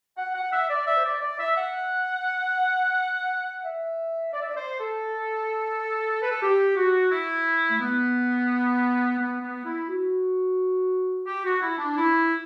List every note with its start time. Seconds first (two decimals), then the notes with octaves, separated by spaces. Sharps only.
0.17 F#5
0.34 F#5
0.52 E5
0.70 D5
0.86 E5
0.97 C5
1.04 D5
1.21 D5
1.39 E5
1.56 F#5
3.64 E5
4.33 D5
4.41 E5
4.49 D5
4.56 C5
4.79 A4
6.22 B4
6.31 A4
6.42 G4
6.76 F#4
7.10 E4
7.70 A3
7.80 B3
9.19 B3
9.41 B3
9.64 E4
9.88 F#4
11.26 G4
11.44 F#4
11.61 E4
11.78 D4
11.96 E4